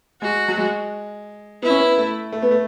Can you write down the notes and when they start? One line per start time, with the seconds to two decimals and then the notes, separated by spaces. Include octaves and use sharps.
0.21 G#3 F#4
0.48 F#3
0.57 G#3
1.62 B3 E4
1.70 C#4
1.79 B3
1.98 A3
2.32 A3
2.42 B3
2.51 A3